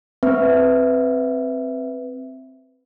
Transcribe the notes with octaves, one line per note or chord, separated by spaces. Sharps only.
C4 B4 E5